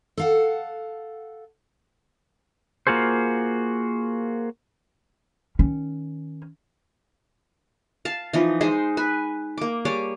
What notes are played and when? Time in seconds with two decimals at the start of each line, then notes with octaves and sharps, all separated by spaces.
0.17 A4 F5 F#5
2.87 A#3 F4 F#4 G#4 C5
5.59 D#3 C#4
8.05 F5 A5
8.33 E3 F3 D#4
8.61 G#3 D#4 G#4 C5
8.97 B4 G#5
9.58 A#3 D6
9.85 G3 G#4 C#5 D6